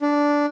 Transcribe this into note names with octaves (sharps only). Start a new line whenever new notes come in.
D4